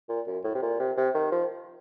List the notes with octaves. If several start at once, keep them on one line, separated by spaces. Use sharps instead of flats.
A#2
F#2
A2
C3
A#2
C3
C3
D#3
F3